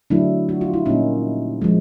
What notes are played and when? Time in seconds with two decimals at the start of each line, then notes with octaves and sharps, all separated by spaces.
0.10 D3 F#3 A3 D4 E4
0.49 F#4
0.61 F4
0.74 E4
0.86 A#2 G3 A#3 C#4 D#4
1.62 F3 G#3